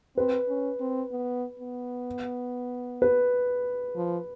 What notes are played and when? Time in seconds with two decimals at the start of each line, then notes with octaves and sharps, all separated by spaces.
0.17 C4 B4
0.48 C#4
0.80 C4
1.11 B3
1.59 B3
3.02 B4
3.96 F3